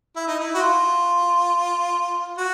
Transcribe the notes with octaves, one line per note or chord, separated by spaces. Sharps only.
E4
D#4
E4
F#4
F4
F#4